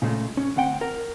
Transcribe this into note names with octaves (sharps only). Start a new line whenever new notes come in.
A#2 C#3 G#3 A3
C#4
D2 C4 F#5 G5
A#4